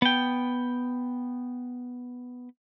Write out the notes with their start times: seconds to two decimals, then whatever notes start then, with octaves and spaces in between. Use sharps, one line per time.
0.02 B3 G5